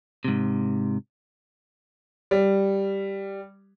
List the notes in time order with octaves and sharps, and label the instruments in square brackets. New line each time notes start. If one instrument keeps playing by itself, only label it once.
[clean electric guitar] G#2 C3
[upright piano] G3